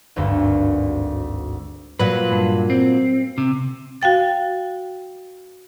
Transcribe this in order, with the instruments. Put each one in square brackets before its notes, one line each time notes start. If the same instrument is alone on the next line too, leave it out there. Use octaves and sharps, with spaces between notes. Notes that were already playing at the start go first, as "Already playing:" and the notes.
[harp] G#1 D2 G2
[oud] A#2 F#3 [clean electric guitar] B4
[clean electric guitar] G2
C4
C3
[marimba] F#4 F5 G5 A6